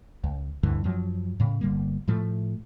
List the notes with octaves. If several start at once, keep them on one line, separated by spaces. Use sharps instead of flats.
C#2
D2 G2 D3 E3
F#2 F3 F#3
A2 C#3
G1 D3 G3 A#3
A2 F3 A3